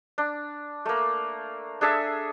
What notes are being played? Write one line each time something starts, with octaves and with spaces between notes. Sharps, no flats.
D4
A3 A#3
D4 G#4 A4 E5